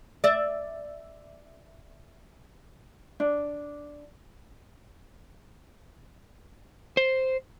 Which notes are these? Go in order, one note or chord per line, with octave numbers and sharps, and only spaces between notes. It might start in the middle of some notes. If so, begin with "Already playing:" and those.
D5 E5
D4
C5